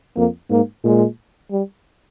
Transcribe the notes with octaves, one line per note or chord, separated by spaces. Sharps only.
F2 A#3
G#2 A#3
A#2 G#3
G3